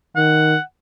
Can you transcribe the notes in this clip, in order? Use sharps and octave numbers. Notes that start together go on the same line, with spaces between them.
D#3 F#5